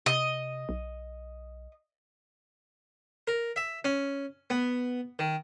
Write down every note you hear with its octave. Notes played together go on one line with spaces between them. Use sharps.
C3 D#5
B1
A#4
E5
C#4
B3
D#3